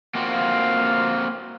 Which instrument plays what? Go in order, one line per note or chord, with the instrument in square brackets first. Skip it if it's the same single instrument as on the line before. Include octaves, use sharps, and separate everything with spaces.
[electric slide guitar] A#3 C4 F#4 [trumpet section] F4 F5